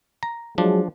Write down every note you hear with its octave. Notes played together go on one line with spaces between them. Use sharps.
A#5
F3 F#3 G#3 D4